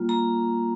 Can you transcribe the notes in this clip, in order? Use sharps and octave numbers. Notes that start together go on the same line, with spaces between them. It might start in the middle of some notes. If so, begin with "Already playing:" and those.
Already playing: G3 A#3 F4
A#5